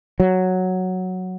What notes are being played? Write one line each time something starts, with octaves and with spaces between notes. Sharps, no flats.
F#3